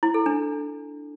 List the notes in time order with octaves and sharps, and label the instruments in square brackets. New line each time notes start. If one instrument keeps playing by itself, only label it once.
[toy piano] E4
A4
D4